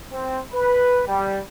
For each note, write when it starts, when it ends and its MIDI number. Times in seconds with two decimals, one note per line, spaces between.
0.12 0.39 60
0.53 1.02 71
1.07 1.38 55